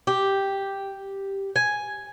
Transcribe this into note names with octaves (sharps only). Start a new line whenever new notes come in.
G4
G#5